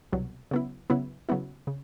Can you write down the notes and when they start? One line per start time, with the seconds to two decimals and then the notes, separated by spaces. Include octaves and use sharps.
0.12 C2 B2 F#3
0.51 C#3 F#3 B3 E4
0.90 C#3 F#3 B3 E4
1.29 C#3 F#3 B3 E4
1.67 C#3